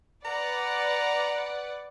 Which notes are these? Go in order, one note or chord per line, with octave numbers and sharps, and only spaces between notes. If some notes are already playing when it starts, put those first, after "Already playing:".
B4 D5 F#5 A#5